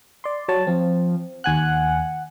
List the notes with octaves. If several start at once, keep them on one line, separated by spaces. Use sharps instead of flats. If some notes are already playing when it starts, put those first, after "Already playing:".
D5 C6
F#3 C#5 A5
F3 C4
D#2 F#5 G#5 F#6